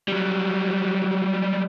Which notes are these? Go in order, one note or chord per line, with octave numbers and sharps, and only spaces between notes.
F#3 G3